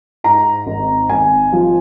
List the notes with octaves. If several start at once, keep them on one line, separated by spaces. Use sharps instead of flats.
G#2 A#5
G#1
G#1 G#5
F3